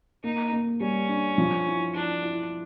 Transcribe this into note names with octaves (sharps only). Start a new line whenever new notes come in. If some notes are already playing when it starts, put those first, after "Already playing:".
A#3 D#4
A#3
G3 C#4
D4
F3
E4
D4 E4
E4